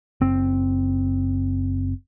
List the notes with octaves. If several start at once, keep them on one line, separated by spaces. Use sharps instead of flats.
F#1 C4